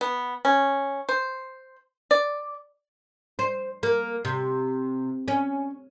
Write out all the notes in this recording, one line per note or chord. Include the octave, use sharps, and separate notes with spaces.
B3
C#4
C5
D5
C5
A#3
C3
C#4